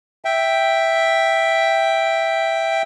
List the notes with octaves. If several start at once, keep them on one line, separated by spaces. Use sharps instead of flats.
E5 G5